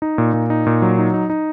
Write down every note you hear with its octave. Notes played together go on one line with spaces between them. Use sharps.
D#4
A#2
A#2
D#4
A#2
F#3
D#4
D#4
D#4